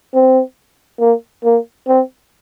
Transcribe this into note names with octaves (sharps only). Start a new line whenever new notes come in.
C4
A#3
A#3
C4